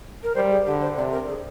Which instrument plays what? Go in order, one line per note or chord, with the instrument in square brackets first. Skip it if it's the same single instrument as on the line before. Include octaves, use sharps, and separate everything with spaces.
[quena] A#4
[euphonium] G3 [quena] C5
[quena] G#4
[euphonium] D3 [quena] G4
[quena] C5
[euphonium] C3 [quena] D5
[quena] A#4
G#4